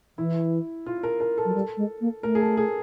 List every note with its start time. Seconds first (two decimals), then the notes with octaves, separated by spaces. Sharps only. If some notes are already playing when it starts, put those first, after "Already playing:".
0.18 E3 E4
0.86 F4
1.03 A#4
1.20 A#4
1.38 A4
1.45 F#3
1.54 G3
1.77 G#3
2.01 A#3
2.23 A3 A#4
2.35 G#4
2.41 A4
2.57 G#4